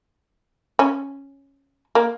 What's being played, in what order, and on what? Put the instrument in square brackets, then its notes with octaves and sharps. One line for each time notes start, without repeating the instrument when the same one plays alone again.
[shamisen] C#4
A#3